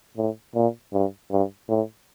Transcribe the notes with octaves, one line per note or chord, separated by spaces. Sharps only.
A2
A#2
G2
G2
A2